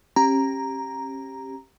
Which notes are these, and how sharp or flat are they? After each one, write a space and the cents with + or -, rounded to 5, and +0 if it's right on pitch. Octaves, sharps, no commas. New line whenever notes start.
C#4 -40 G4 +0 A#5 +0